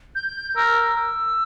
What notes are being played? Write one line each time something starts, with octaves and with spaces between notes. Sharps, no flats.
G6
A#4 E6
E6